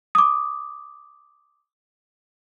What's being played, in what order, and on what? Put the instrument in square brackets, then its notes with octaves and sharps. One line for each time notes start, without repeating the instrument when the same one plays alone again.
[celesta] D6 D#6